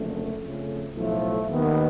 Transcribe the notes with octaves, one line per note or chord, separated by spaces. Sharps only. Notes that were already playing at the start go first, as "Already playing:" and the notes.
Already playing: F#1 F2 D3 A3
F2 C#3 F3 A3
B1 A2 F3 A3
D#2 D#3 B3